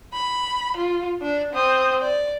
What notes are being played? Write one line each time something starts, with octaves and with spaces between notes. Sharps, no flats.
B5
F4
D4
C4 D#6
D5